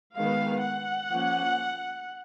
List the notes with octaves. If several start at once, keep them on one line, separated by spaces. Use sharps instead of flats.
D#3 G#3 B3 F5
F#5
F3 A#3 C#4